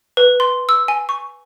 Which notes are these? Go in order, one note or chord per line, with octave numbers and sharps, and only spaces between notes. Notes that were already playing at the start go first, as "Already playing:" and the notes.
B4
C6
E6
G#5
C#6